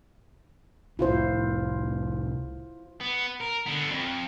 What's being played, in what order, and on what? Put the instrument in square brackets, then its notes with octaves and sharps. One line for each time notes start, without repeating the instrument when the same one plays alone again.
[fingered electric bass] C2 A2 [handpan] E4 F4 C5
[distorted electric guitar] B3
A#4
D3 B3
F2